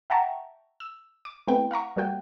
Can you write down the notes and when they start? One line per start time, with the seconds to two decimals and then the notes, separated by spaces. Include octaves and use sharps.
0.10 E5 F#5 G5 A5 A#5 C#6
0.80 E6
1.25 D6
1.47 A3 B3 C4 E4 B4 G5
1.71 F5 F#5 A#5 C#6
1.96 G3 A#3 F#4 G5